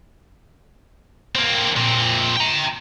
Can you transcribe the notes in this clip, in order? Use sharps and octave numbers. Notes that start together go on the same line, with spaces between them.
A#3 C4
A#2 C4
G5 A#5